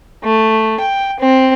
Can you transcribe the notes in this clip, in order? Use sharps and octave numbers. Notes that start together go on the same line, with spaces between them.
A3
G5
C4